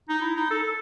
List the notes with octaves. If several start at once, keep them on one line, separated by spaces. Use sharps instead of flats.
D#4
E4
D#4
A4
A4